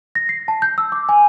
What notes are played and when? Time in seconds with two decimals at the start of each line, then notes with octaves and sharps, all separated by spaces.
0.15 A#6
0.29 C7
0.48 A5
0.62 G6
0.78 E6
0.92 D6
1.09 G#5